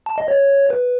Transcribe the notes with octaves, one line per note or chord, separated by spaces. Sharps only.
A5
D#5
C#5
B4